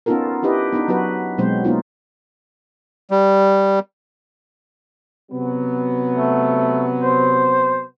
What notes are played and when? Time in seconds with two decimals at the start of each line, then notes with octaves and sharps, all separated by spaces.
0.06 B3 C#4 D#4 F4 A4 A#4
0.43 D4 E4 G4 B4 D#5
0.72 B3 D4 D#4
0.88 F#3 B3 F#4 B4
1.38 B2 F#3 G#3 C4 C5
1.64 A#3 B3 D#4 F4
3.11 G3
5.32 C3 F#3 B3
6.12 A3
7.00 C5